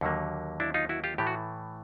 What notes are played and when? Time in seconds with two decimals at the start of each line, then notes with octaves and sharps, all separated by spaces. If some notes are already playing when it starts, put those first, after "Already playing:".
0.01 D#2 D3 F#3 A#3
0.60 D4 E4
0.74 D#4 F4
0.89 E4 F#4
1.04 F4 G4
1.18 A2 E3 A3 G4
1.27 F#4